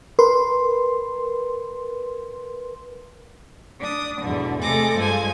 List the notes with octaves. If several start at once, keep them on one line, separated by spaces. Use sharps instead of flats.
A#4 B4 C6
D4 D#6
E2 G#2 B2 D3
C3 G#3 A3 A4 D6 A#6
G2 F3 G#3 G#5 G#6